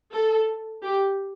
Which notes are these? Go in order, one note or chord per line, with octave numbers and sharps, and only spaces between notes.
A4
G4